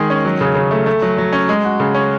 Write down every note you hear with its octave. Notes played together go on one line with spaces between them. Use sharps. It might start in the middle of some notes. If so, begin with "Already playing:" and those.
Already playing: D#3 G#3 G#4
C#4
F#3
C#3
C#3
A3
A3
F#3
F#3
C#4
G#3
F#4
C#3
C#4